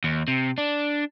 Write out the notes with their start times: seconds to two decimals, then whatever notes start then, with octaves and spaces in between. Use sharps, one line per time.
0.04 D#2
0.28 C3
0.58 D4